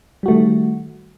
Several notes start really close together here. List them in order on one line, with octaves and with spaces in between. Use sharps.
G3 F#4 A3 D#3